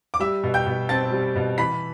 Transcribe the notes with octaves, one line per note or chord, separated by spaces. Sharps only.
D6
G3 E5 E6
B2
G5 G6
B2
C4 A5 A6
G3
B2
E3 B5 B6